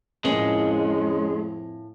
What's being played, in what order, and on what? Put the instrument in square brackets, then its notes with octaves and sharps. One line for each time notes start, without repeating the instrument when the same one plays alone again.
[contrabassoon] F2 [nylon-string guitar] A2 A#3 F4 [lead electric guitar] G#3 [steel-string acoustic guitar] C#4